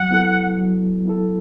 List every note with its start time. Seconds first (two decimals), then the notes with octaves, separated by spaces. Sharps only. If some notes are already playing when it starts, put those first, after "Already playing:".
Already playing: F#3 F#5
0.11 B3 E4 A4
0.58 F#3
1.05 B3 E4 A4